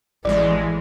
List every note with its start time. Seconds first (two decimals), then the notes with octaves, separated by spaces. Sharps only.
0.25 A1 E3 G#3 D5